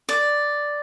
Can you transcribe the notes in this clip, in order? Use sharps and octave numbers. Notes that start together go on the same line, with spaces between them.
D5